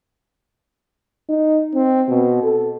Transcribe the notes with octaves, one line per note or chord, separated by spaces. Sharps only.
D#4
C4
B2
A4